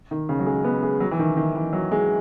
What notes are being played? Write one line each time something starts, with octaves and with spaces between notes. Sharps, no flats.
D#3
C#3
F#3
G#3
B3
G#3
F#3
E3
D#3
D#3
E3
F#3
G#3